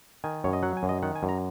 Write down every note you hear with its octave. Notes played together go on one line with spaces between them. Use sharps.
D#3 G#5
F#2 C#5
D#5
F#3 F#5
G#5
F#2
D#5
D#3 F#5
G#5
F#2
A#5